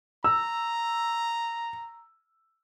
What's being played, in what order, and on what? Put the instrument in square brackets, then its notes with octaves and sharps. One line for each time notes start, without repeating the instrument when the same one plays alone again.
[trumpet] A#5 [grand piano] E6